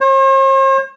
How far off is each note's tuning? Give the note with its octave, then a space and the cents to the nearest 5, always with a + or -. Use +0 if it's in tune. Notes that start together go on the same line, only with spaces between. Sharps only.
C5 +45